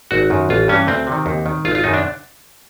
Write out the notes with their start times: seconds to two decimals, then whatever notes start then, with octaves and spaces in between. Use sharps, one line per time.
0.11 G#1 F#4
0.30 F#2 D#3
0.49 A1 F4
0.68 G2 E3 C#4
0.87 D2 C4
1.07 C3
1.12 D#3
1.26 D#2
1.46 D#3
1.65 G#1 F4
1.75 F4
1.84 F#2 D#3 D#4
1.94 D4